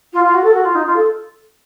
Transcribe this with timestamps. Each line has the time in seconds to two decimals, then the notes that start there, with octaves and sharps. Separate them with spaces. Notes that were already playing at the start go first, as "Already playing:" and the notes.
0.13 F4
0.24 F4
0.34 F#4
0.43 A4
0.54 F#4
0.64 F4
0.75 D#4
0.85 F4
0.96 A4